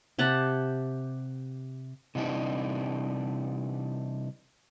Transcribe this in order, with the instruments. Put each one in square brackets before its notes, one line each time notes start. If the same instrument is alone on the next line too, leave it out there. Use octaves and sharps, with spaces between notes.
[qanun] C3 G4 F#5 A5
[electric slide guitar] C3 E3 G3 D4 D#4